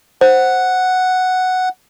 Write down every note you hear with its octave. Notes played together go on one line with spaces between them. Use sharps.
C5 F#5